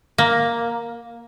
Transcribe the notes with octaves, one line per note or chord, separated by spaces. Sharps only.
A#3